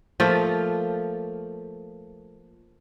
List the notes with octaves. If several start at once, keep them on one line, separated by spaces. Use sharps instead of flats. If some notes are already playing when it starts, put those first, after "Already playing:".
F3 A3 A#3 F4